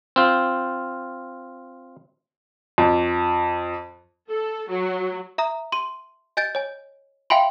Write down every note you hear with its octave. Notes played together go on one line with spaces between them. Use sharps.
C4 F4
F2
A4
F#3
E5 A#5 D#6
C6 D#7
D#5 G#5 G6 A6 D7
C#5 G#5
E5 F5 G5 G#5 B5 C6